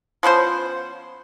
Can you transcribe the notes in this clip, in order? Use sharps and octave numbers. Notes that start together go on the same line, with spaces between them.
F3 B3 C#4 C5